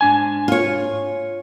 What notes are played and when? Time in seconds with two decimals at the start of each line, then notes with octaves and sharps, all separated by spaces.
0.01 G#2 D4 G#5
0.48 F4 C#5